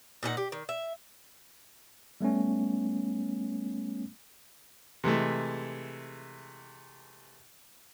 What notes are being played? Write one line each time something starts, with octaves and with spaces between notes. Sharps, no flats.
A#2 D#4 G#4 F#5
G4
D#3
E5
G3 A3 B3 C#4
C3 E3 G#3 A3